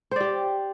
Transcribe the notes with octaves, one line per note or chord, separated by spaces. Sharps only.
G4 C5 D5